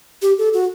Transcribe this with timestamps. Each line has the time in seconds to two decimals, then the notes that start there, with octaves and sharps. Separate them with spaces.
0.22 G4
0.38 A4
0.53 F#4